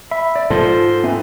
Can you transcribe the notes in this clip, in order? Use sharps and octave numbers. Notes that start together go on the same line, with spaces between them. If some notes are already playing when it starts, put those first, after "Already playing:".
E5 B5
D5
G#2 F3 F4 A4 C5
E3 C4 D#4 B4